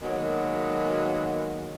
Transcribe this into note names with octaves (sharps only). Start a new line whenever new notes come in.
B2 D#3 F#3 G#3 A#3